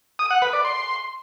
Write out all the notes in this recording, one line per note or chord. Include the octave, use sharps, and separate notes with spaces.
D#6
F#5
B4
D5
C6